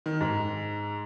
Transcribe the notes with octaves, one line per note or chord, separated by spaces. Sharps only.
D#3
G#2